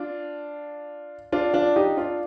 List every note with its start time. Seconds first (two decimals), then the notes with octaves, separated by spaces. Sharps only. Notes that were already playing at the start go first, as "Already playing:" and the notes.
Already playing: D4 F4
1.32 D4 F4
1.54 D4 F4
1.76 D#4 G4
1.97 D4 F4